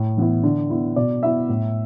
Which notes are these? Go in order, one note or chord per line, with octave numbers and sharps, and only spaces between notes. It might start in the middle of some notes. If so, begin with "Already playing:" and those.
Already playing: A2
E3 B3 E4
D3
B3 E4
B2 D5
B3 E4 E5
A2